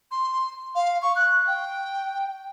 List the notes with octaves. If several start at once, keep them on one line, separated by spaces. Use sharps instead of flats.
C6
F5
C#6
F#6
G5